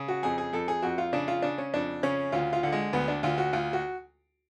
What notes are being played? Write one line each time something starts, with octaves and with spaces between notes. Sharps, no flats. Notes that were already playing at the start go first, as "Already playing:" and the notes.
Already playing: C#3
F#4
F2 G#4
G#4
F2 A4
G#4
F2 F#4
F4
C#3 D4
F4
C#3 D4
C#4
F2 D4
C#3 C#4
D2 F4
F4
D3
G#3
D2 B3
D4
D2 F4
F#4
D2 F4
F#4